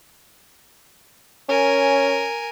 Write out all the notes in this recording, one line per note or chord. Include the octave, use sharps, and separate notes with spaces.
C#4 A#4 G#5